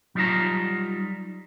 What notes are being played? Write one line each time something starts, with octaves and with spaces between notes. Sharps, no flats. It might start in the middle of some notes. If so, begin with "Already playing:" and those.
F#3 G3 D#4 F4 A5 A#5